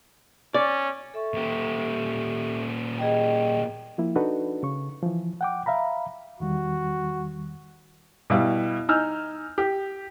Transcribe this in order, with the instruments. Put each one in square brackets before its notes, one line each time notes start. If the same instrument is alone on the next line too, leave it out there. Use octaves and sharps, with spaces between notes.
[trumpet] C#4 [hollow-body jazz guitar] D5
[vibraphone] A4 E5 C#6
[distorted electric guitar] A#2 G4
[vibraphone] G#4 D#5 G5
[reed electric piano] F3 A#3 E4
D4 D#4 F#4 A4 B4
C#3 C#6
E3 F3
F#5 G5 D6
E5 F5 A#5 B5
[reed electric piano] E2 D#3 G3 [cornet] F#4
[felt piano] B2 G3 E4 F5
D#4 G#5 E6 F6 G6
G4